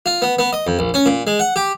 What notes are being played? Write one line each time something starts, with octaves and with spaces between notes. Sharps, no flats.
F4
B3
B3
D#5
F2
A#1
C#4
A#2
G#3
F#5
G4